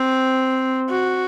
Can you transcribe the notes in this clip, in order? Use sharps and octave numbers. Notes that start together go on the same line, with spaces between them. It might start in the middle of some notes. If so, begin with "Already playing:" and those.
Already playing: C4
F#4